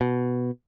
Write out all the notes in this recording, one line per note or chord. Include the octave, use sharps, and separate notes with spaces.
B2